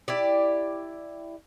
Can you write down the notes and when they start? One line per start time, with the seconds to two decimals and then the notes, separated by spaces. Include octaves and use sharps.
0.08 E4 G4 D5